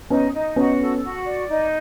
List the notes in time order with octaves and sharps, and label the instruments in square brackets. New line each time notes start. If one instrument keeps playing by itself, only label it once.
[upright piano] B3 C#4 [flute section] D#4
[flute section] D#4
[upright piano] B3 C#4 [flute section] F#4
[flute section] A4
F#4
D5
D#4